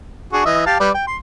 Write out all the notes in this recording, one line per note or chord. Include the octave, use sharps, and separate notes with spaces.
D4 F#4 G#4
E3 D#5 E5
G4 F5 A5
G3 B4 D5
G5
C6